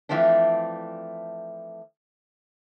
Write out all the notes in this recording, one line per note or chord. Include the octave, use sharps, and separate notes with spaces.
E3 F3 A3 C4 D4